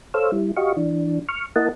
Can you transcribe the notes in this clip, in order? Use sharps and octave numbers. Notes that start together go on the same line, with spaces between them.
A4 C5 C#5 F5 E6
G3 E4
F#4 G4 D#5 F5 C#6
E3 D4
C#6 F6
A#3 E4 A#4 D#5 F#5 A5